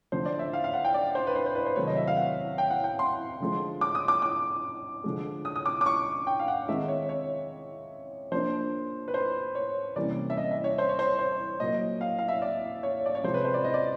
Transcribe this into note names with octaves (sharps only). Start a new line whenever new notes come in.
D3 F3 A3 C5
D5
E5
F5
F5
F#5
G5
D5
C5
B4
C5
C5
B4
C5
C3 D#3 F#3 A3 C#5
D#5
E5
F5
F#5
G5
F#5
G5
C6
D3 F3 G#3
D6
D#6
D6
D6
D3 F3 G#3
D#6
D#6
D6
D6
C#6
G5
F5
F#5
D#3 G#3 C4 D#4 E5
C#5
C#5
F3 A#3 D4 C5
B4
C5
C#5
C3 E3 G3 A#3 C#4 D5
E5
D#5
E5
C#5
C5
C#5
C5
C5
A#2 F#3 A#3 D#5
F5
F5
E5
D5
C#5
D5
C#5
C3 F3 G#3 C5
B4
C5
D5
D#5
D5